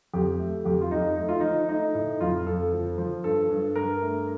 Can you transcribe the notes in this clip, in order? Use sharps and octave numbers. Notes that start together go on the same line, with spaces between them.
F2 G4
A3
F2 G4
F4
F2 D#4
A3 D#4
F4
F3 D#4
A3 D#4
A2
F2 F4
F2 A4
F3
F3
G2 A4
G2
G2 A#4
A3